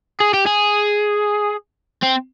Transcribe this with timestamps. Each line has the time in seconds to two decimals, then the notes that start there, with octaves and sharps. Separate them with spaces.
0.20 G#4
0.33 G4
0.46 G#4
2.03 C4